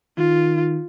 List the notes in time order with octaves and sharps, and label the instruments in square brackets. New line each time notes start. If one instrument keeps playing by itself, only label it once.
[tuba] D#3 [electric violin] F4